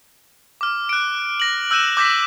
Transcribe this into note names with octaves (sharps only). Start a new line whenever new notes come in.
D6 F6
F#6 D7
A#6 F#7
E6 F#6 G6 D#7 E7
D6 G6 A#6 B6